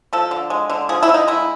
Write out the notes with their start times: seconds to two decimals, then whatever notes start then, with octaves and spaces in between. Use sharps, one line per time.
0.13 F3 A4
0.31 D3
0.50 G#3
0.70 D3
0.89 F3 G#4
1.03 E4
1.09 D3
1.14 D#4
1.28 G#3 E4